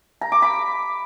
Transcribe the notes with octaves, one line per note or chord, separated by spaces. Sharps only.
A#5
D6
B5